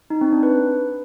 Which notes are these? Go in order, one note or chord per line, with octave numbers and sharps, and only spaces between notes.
D#4
C4
D4
B4